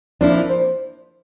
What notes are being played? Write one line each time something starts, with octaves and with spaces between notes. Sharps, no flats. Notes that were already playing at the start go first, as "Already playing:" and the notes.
F3 A#3 D4 E4
C5